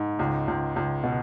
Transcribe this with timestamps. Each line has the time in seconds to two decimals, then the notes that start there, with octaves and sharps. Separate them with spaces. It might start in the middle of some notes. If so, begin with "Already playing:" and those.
Already playing: G#2
0.19 C#2
0.48 C#2
0.76 C#2
1.03 B2